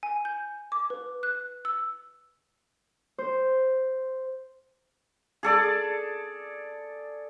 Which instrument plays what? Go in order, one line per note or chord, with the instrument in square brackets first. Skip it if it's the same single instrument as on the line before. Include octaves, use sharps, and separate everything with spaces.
[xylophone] G#5
G6
D6
B4
F#6
E6
[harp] C5
[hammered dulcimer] G#4 A4 D5